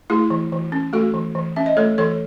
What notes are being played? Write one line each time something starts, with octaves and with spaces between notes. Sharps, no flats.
A3 E4 G#4
E3
E3
C#4
A3 F#4 A4
E3
E3
C#4 E5
D#5
A3 A4 C#5
E3 A4 C#5